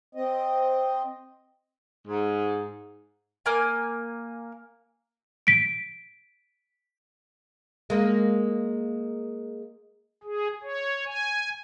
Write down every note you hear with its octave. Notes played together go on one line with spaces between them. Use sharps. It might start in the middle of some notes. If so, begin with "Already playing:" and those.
C4 D#5
G#2
A#3 G#5
B6 D7
G#3 A#3
G#4
C#5
G#5